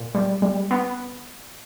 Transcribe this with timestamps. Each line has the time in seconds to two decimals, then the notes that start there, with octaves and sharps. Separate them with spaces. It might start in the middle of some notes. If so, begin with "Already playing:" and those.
Already playing: A#2
0.15 G3
0.42 G3
0.71 B3